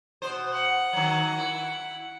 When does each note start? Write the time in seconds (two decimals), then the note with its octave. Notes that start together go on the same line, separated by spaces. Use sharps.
0.22 B2 C5
0.53 F#5
0.93 D#3 F#3
1.37 E4